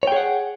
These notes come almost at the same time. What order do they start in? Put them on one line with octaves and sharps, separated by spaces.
C#5 G5 G#4 F#5